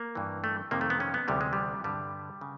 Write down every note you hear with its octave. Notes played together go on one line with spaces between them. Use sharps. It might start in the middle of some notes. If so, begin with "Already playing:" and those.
Already playing: A#3
G2 E3
A3
F2 C3 D#3 A#3
A3
B3
C#4
B3
D2 C3 E3 G3
G#3
G3
G2 D3 G3
C#3